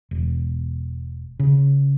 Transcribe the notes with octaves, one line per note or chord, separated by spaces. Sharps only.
E1
C#3